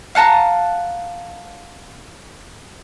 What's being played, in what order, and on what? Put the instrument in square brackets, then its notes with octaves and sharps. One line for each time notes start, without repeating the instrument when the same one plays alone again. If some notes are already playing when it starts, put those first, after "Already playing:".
[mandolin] F5 F#5 A5 A#5